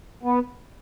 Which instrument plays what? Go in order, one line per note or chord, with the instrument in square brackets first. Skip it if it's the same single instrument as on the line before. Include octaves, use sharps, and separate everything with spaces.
[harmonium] B3